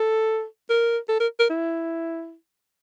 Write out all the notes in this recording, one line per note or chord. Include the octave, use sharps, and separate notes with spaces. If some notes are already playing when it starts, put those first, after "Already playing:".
Already playing: A4
A#4
A4
A#4
A#4
E4